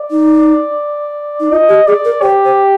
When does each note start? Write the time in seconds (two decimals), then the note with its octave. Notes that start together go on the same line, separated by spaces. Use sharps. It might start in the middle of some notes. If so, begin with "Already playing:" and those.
Already playing: D5
0.11 D#4
1.40 D#4
1.51 F4 D#5
1.69 G4
1.87 G#4 D5
2.05 A#4
2.22 G4 C5
2.45 C5